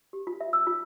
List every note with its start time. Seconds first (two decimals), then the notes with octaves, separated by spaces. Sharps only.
0.13 G4
0.27 F4
0.41 E5
0.53 E6
0.67 F4